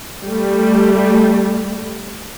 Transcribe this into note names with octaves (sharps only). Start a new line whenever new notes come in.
G3 A3